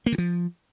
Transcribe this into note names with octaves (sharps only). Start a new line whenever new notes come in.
A#3
D3
F3